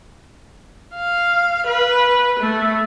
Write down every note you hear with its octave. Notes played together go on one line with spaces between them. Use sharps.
F5
B4
A3